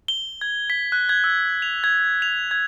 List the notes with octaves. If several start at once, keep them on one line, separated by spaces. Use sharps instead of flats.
G7
G#6
B6
F#6
G#6
E6
F7
G#6
F7
G#6